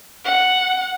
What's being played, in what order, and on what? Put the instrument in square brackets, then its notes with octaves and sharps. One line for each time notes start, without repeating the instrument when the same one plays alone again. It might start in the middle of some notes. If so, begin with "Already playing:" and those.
[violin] F#5